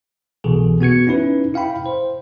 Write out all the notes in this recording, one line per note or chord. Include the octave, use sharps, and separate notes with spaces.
C2 B2 E3 G#4 A4
B3 F#4 G#6 C#7
C#4 D#4 E4 B4
E4 F5 G5 B5
C5